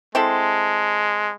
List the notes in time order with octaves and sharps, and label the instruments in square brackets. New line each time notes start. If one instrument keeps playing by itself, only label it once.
[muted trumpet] G#3 [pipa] C4 E4 A4